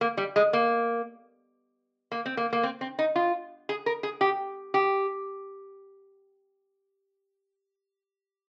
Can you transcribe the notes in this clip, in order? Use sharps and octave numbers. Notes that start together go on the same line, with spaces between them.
A#3
G3
G#3
A#3
A#3
C4
A#3
A#3
C4
C4
D#4
F4
G#4
A#4
G#4
G4
G4